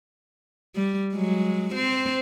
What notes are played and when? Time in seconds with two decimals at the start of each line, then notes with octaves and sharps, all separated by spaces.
0.75 G3
1.14 F#3 G#3
1.74 C4 C5